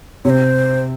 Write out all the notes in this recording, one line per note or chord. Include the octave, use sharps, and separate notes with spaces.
C3 C5 C#5